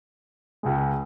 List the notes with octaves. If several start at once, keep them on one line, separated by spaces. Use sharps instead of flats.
C#2 C#3 G#3